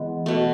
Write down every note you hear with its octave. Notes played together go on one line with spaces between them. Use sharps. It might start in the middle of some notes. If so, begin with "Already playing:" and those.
Already playing: E3 G#3 B3
B2 A3